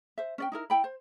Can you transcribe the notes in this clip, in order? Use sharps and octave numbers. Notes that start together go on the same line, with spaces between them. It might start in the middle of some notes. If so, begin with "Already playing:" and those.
C5 E5
C#4 D5 G5
D#4 E4 A#4
E4 G5 B5
C5